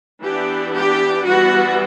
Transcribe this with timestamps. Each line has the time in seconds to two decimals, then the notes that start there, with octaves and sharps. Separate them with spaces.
0.22 E3 B3 D4 G4
0.73 G4
1.24 E3 G3 B3 F#4